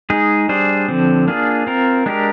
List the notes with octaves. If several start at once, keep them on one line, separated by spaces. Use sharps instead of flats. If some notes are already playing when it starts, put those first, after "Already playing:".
G#3 D#4 G#4
G3 D4 G#4 C5
D3 F3 C4
A#3 D4 F4 G#4
C4 F4 A#4
G#3 D4 G4 A#4